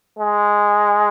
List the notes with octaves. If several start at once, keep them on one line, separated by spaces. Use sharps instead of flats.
G#3